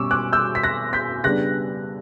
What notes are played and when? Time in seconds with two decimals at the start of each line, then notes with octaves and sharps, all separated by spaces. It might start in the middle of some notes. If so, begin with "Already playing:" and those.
Already playing: B2 G3 C#4 C#6 D6 E6
0.11 D6 F#6
0.33 E6 G6
0.55 B6
0.63 F#6 A#6
0.93 G6 B6
1.24 C#3 G3 B3 D4 F#6 A#6